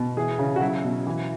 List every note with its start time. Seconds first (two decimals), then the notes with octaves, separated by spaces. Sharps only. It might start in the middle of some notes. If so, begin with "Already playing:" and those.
Already playing: B2
0.17 E3 G#4
0.39 C#3
0.56 F#4
0.61 F#3 E4
0.84 B2
1.07 E3